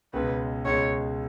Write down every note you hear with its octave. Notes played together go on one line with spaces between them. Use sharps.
C#2 B2 G#3 C#4 B4
C#2 B2 G#3 C#4 C#5